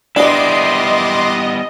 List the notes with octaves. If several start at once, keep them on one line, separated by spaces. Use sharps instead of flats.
G3 B3 D4 E4 D5 D#5 C6 D6